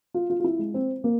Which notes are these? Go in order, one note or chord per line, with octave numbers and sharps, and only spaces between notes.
F4
F4
F4
E4
G#3
C4
A#3